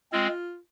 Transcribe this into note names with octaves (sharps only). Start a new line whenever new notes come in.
G#3 C4 F4